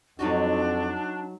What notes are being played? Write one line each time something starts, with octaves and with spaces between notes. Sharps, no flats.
F2 F#3 D4 D#4 F#4